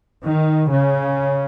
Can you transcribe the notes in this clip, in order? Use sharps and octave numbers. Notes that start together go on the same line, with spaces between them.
D#3
C#3